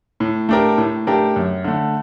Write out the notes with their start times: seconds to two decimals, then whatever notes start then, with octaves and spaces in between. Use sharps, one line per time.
0.20 A2
0.49 A3 D4 G4 A#4
0.78 A2
1.07 A3 D4 G4 A#4
1.36 F#2
1.64 D3 A3